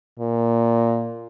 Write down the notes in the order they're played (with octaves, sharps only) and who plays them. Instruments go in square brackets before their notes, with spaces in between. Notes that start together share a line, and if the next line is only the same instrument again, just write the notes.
[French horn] A#2